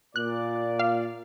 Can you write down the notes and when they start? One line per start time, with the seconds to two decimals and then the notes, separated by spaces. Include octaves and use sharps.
0.16 A#2 D5 F#6
0.79 F5